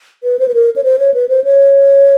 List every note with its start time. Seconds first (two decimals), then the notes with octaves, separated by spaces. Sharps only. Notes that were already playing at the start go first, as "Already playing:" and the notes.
0.24 B4
0.39 C5
0.48 B4
0.54 A#4
0.76 C#5
0.84 C5
0.99 C#5
1.14 B4
1.29 C5
1.44 C#5